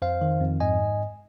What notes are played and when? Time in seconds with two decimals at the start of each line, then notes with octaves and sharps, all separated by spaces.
0.02 F2 C5 F5
0.21 D#3
0.41 F2
0.60 G#2 D#5 G#5